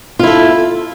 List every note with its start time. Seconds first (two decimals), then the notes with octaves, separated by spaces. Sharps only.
0.19 F4
0.23 E4
0.27 A4